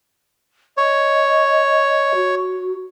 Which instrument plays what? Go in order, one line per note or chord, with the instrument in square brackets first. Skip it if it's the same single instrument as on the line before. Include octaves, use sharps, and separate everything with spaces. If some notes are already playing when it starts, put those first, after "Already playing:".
[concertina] C#5 [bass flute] D#5
[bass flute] F#4